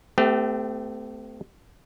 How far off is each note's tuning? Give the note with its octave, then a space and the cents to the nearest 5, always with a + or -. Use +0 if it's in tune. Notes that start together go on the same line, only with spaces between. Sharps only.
A3 +0 C4 -45 G4 +0